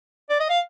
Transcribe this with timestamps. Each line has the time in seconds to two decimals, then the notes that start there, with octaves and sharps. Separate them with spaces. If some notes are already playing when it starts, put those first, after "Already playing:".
0.30 D5
0.40 D#5
0.50 F5